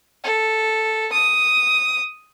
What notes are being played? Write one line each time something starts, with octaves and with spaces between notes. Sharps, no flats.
A4
D#6